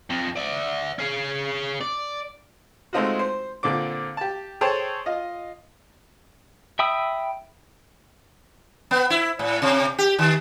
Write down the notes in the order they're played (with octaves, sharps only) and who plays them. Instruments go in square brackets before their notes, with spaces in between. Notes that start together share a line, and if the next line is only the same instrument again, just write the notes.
[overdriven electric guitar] F2
D5 E5
C#4 G#4
D5
[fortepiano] G#3 A3 C4 D#4 F4 F#4
C5
A#2 D3 C4 D6
G4 A5
G#4 A4 C5 C#5 G5 A5
F4 D#5
[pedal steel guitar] E5 G5 B5 D#6 E6
[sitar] B3
E4
A2
C3
G4
D#3